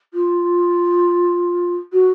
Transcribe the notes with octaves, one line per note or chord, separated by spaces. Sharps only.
F4
F#4